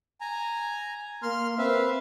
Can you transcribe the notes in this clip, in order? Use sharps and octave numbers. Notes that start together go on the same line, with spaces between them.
G#5 A#5
A#3 C6 F6
C4 B4 E5 F5